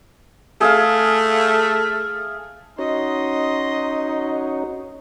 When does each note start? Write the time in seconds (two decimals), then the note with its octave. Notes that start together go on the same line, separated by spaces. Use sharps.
0.61 A3 G#4 E5 F5
2.79 C#4 D#4 F#4 C#5 D#5 C6